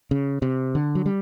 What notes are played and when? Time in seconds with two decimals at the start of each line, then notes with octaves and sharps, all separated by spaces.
0.11 C#3
0.42 C3
0.75 D3
0.95 F#3
1.06 G3